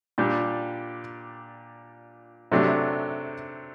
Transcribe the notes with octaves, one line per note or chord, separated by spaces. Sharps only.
A#2 G3 D4 G4
C3 F#3 A3 D4 G4